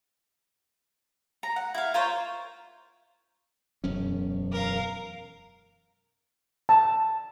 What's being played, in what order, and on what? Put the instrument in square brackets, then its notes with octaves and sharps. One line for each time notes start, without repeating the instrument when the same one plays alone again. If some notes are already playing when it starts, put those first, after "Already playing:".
[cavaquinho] A#5
F#5
E4 F5
F4 A#4 C5 C#5
[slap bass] E1 F#2 C#4
[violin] A#4 F5
[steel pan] A5